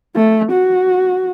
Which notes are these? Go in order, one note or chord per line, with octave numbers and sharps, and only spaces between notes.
A3
F#4